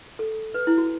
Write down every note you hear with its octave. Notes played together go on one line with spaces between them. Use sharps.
A4
B4
E4
F#4